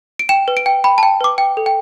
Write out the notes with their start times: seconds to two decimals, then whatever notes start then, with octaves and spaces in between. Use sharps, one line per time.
0.19 D7
0.29 G5 E7
0.48 B4
0.57 D7
0.66 G5
0.84 G5 B5
0.98 A5
1.03 G5
1.21 B4 D6
1.38 G5
1.57 A4
1.66 G5